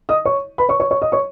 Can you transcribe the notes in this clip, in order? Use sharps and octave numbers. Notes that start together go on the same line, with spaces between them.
D#5 D#6
C#5 C#6
B4 B5
C#5 C#6
C#5 C#6
C#5 C#6
D#5 D#6
C#5 C#6